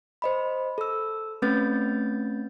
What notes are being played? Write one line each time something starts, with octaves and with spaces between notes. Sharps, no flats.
C5 D#5 B5
A4 E6
A3 C4 C#4 B4 G6 A6